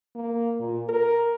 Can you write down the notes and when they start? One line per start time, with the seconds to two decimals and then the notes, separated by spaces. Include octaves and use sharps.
0.15 A#3
0.60 A#2
0.89 A#4